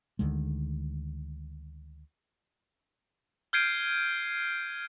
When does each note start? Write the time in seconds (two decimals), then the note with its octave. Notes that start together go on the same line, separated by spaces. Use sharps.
0.19 D2 D3 D#3 G#3
3.53 F6 G6 G#6 C7 D7 D#7